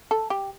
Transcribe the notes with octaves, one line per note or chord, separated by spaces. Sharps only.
A4
G4